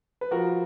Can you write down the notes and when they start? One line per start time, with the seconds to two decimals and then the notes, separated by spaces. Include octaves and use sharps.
0.21 B4
0.31 F3 F#4 A#4